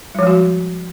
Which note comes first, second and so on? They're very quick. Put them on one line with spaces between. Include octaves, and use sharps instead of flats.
G3 F3 G#3 F#4